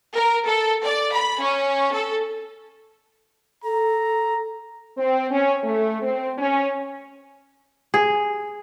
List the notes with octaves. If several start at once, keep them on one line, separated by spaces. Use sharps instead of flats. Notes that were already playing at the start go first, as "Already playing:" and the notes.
A#4
A4
D5
B5
C#4
A4
A4 A#5
C4
C#4
A3
C4
C#4
G#4